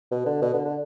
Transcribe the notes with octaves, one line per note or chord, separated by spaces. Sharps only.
B2
D3
B2
D3
D3